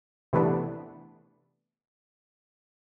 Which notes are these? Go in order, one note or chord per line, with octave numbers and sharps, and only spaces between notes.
C3 E3 A3 B3 D4